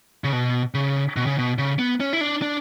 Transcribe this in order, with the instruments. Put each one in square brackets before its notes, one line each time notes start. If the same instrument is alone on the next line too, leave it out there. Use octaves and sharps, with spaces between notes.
[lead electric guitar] C#3
B2
C#3
B2
C#3
B2
C#3
B3
C#4
E4
D4
D4